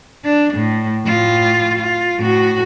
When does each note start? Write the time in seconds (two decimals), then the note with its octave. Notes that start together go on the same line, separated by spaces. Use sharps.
0.24 D4
0.54 A2
1.04 A2 F4
1.78 F4
2.19 A2 F#4